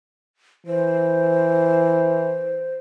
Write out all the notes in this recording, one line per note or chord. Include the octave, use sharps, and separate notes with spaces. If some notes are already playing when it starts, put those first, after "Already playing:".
E3 C5